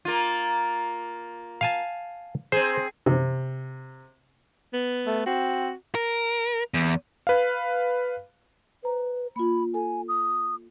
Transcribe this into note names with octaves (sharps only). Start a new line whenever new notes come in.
A#3 F4
F5 G#5 A5
C4 G#4 C5
C3
B3
A3
C4 F#4
A#4
E2
B4 F5
B4 C5 A#5
A#3 F4 B5
A4 G#5
D#6